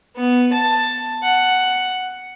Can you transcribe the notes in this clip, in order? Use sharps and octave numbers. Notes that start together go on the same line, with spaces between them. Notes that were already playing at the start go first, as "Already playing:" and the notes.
B3
A5
F#5